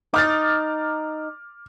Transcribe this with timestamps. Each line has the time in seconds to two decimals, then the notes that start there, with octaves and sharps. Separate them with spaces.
0.14 D#4 D6 F6 A6